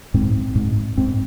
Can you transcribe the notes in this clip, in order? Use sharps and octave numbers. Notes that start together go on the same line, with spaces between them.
G#2 C4
G#2
G#2 C4